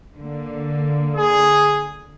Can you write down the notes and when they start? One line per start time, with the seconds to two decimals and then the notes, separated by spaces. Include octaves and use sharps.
0.15 D3 A#3
1.15 G#4